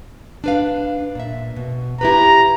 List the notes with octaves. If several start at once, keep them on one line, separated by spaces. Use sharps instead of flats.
D4 B4 F5
A#2 E5
B2
E4 G4 B4 A#5